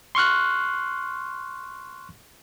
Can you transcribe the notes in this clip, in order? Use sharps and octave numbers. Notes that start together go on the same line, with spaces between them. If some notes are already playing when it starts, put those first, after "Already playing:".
C6 C#6 F6 F#6